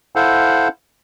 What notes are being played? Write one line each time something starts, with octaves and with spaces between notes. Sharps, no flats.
E4 A4 C5 F5 F#5